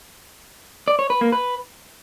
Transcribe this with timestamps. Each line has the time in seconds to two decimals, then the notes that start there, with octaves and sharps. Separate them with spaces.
0.88 D5
0.99 C#5
1.10 B4
1.21 A#3
1.32 B4